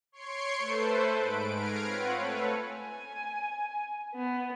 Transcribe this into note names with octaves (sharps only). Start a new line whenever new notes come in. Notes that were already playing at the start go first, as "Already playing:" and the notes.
C#5 C6 C#6 C7 D7
A3 A4 B4 C5
G#2 B4 D7
F6 G#6 A#6 C7 D7
C4 F4 B4 C#5 F#5
A3 A4 B4 C#5
G#5
B3